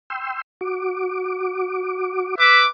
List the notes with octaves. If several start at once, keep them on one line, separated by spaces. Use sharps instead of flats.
G5 C6 E6
F#4 D6
B4 E5 D6